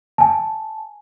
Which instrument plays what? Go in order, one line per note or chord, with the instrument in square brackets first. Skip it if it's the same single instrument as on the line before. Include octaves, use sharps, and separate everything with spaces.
[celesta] G#5 A5